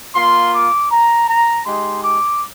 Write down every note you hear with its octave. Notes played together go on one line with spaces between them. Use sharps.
A#3 F4 C6
D6
A#5
A#5
G#3 D#4 G4 C6
D6